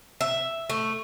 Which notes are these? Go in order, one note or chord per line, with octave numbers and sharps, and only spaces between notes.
E5
A3